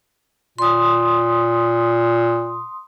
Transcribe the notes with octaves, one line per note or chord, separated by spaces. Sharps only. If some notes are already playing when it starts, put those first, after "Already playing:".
A#2 C6 D#6